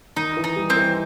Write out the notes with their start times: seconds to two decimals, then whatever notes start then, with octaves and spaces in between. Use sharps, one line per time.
0.16 D#3 D#4
0.37 E3
0.44 D#4
0.56 G3
0.70 C4
0.76 E3